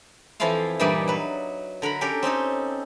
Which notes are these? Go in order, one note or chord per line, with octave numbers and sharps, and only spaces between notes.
F2 E3 F3 E4 F4 F5
G2 A#2 E3 G3 D#4 D5
F#3 B4
D3 A#4 F#5 B5
C#4 G4 A4 A#4
C4 C#4 D#4 A4